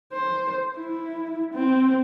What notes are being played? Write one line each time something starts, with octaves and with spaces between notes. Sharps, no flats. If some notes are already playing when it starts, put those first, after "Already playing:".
C5
E4
C4